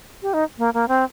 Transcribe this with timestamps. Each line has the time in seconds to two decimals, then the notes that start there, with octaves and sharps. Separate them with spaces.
0.22 G4
0.34 D#4
0.58 A#3
0.74 A#3
0.88 C4